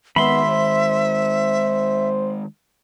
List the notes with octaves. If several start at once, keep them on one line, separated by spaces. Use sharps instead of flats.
D#3 G#3 B3 E5 B5 C6
C5